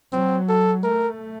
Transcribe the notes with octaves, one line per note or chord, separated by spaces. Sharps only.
F#3 C4
A4
A3 A#4